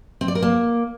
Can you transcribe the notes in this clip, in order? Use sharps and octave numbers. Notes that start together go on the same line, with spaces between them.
C4
D5
A#4
A#3